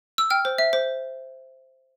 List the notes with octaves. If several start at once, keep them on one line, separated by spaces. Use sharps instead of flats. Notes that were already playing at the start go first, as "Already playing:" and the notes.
E6
G5 F6
C5
E5
C5